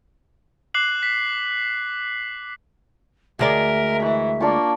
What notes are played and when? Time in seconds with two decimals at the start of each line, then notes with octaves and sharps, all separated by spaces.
0.74 D6 F#6 C7 F#7
1.03 B6
3.39 D2 G#3 A#4 D5 E5
4.02 E3 C#6
4.40 A#3 D4 F4 C#6